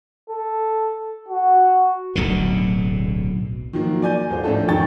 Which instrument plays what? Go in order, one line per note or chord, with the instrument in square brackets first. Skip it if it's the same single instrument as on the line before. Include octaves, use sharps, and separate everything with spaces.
[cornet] A4
F#4
[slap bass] D1 B1 B2 D3
[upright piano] D#3 F3 F#3 A#3
D5 G#5 G6 D#7
D#1 F4 C5
A2 F3 C#4 D4 A4 A5
E1 B2 D#3 G5 C#6 A6